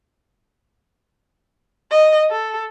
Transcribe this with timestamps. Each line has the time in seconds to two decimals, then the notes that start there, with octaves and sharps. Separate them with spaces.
1.91 D#5
2.30 A4